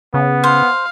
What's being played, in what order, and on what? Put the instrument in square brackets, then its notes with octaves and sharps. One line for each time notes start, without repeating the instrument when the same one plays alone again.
[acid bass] C#3 [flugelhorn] B3
[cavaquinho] C5 [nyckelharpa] F5